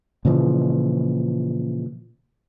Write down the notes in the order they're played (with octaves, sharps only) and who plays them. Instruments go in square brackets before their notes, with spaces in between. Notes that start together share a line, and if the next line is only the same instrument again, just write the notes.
[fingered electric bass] A#2 C#3 E3 F3